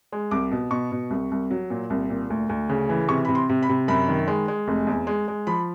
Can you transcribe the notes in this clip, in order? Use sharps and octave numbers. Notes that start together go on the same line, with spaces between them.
G#3
C2 D6
B2
B2 C#6
B2
C2
C2
F#3
A#2
C2
A#2
D2
D2
C#3
E3
C3 C#6
C3 B5
C6
C3
B5
C3
F#2 B5
D#3
G#3
G#3
F1
E2
G#3
G#3
F3 B5